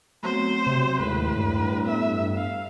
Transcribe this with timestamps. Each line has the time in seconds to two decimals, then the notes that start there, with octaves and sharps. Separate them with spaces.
0.23 F#3 A3 B3 C4 C5
0.67 C3 F#3
1.00 D#2 A2 G#3 B4
1.38 G2
1.86 B3 E5
2.36 F5